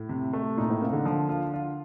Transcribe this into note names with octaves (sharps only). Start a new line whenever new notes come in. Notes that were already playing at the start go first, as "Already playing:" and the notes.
Already playing: A2
C3
A3
A#2 D#4
A2
C3 A#3
D3
F3
F4
F4